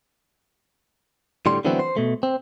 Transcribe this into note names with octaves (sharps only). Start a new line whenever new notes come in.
A2 D3 G3 C6
D3 E3 F#3 A3 B3 C4
C5
B2 A3
C4